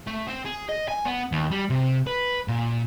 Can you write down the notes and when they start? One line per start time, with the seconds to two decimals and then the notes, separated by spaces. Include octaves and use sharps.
0.07 A3
0.27 C4
0.45 G#4
0.69 D#5
0.88 G#5
1.05 B3
1.32 D#2
1.51 G3
1.70 C3
2.07 B4
2.48 A#2